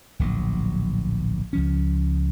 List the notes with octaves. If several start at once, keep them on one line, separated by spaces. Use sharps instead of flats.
D1 A#1 F#3
C#2 F3 C#4